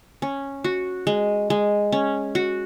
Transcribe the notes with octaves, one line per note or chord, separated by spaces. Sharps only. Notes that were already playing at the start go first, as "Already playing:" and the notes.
C#4
F#4
G#3
G#3
C#4
F#4